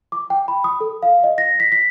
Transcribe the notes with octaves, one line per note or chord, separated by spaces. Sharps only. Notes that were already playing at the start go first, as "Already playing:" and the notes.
D6
G5
B5
D#6
A4
F5
D#5
A#6
B6
B6